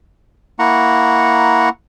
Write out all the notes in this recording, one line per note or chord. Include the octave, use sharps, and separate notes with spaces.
A#3 E4 F#5 A#5 C#6